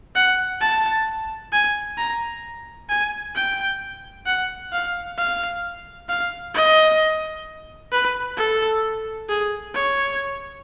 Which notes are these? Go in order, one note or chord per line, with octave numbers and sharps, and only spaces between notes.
F#5
A5
G#5
A#5
G#5
G5
F#5
F5
F5
F5
D#5
B4
A4
G#4
C#5